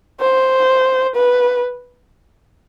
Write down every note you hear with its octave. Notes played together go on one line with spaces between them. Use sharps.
C5
B4